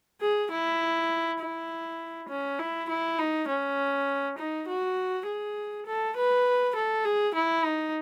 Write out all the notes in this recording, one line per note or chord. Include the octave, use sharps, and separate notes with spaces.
G#4
E4
E4
C#4
E4
E4
D#4
C#4
D#4
F#4
G#4
A4
B4
A4
G#4
E4
D#4